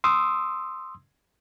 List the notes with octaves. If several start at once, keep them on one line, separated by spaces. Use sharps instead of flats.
C6 D#6 E6